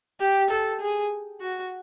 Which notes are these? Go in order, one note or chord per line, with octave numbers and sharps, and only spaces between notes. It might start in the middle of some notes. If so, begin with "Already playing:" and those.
G4
A4
G#4
F#4